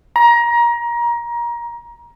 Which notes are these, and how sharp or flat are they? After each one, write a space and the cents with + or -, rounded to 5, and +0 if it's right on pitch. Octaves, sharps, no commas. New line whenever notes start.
A#5 +25